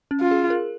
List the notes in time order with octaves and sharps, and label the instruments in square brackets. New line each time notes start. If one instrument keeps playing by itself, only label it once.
[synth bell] C#4
[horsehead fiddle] F4
[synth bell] G#4
A#4